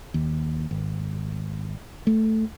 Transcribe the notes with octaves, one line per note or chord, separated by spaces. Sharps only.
D#2
G#1
A3